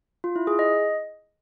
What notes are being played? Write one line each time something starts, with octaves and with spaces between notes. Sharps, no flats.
F4
E4
G#4
D#5